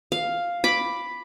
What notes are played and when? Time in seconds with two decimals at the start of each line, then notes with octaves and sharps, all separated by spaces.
0.12 F5
0.64 B5 D6